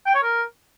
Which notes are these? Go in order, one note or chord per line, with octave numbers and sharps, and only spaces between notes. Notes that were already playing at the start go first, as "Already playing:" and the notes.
G5
C#5
A#4